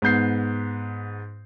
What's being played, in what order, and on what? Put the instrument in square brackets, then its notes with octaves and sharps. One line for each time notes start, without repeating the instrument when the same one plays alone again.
[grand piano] G#2 B3 G6 C7